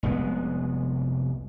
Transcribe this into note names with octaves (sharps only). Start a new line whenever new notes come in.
F1 C2 G#3 B3